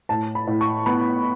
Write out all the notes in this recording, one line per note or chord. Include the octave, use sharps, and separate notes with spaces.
A2 A5
B5
A2
C#6
B3 B5